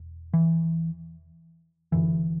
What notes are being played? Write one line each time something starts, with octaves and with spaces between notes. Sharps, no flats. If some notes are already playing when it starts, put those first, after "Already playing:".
Already playing: E1
E3
F#1 F#2 D3 E3